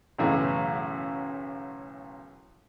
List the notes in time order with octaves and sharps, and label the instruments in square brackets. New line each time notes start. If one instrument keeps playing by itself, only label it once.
[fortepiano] B1 F#2 A2 C#3 E3 A3